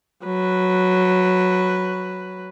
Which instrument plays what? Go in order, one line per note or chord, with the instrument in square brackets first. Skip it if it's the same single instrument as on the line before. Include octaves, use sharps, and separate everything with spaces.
[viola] F#3 B4